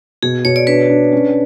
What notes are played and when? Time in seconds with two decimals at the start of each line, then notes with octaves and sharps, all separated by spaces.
0.23 B2 G#4
0.45 B2 C#5
0.56 D5
0.67 D4 B4
0.90 D4
1.12 C#4